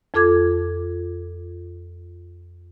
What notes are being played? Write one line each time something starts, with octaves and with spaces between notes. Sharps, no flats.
F2 F4 A4 D6 G#6